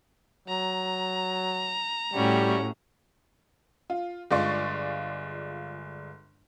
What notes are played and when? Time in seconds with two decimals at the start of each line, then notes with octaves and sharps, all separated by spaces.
0.48 F#3 A#5
2.14 A2 G3 C#4 F#4 G4
3.90 F4
4.31 G1 G#3 F4 D5 C6 C#6